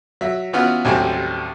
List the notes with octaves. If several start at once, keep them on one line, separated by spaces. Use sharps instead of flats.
F#3 E5
E3 B3 C#4 F4 F#4
A1 D#2 F#3 G3 C4 G#5